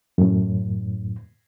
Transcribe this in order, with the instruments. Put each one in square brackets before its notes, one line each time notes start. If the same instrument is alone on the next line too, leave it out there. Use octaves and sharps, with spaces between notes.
[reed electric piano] F#2 A2